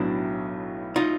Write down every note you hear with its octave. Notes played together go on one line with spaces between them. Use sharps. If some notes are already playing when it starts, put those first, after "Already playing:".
Already playing: B1 A2 F#3 B3 D4 E4
D#4 F4